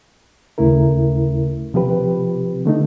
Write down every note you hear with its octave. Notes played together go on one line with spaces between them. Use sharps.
D#2 C#3 A3 E4 A#4
C3 F3 C4 G4 B4
D3 A3 D#4